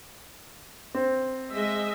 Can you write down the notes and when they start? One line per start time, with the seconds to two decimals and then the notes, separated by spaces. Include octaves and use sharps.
0.95 C4
1.53 G#3 D#5 E5